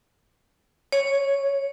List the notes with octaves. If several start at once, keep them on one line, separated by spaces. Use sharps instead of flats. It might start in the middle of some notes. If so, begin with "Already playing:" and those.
C#5